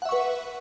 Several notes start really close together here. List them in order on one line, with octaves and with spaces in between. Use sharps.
F#5 E5 C#6 B4